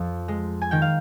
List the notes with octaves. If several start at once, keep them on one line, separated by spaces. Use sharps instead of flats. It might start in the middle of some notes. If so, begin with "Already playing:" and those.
Already playing: F2 F3
G#3
G#5
D#3 G5
F5